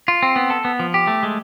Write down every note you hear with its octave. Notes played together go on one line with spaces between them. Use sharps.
F4
C4
B3
A4
B3
F3
G4
A3
G#3